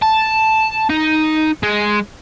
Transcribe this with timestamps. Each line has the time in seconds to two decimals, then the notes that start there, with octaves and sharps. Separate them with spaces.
0.02 A5
0.90 D#4
1.63 G#3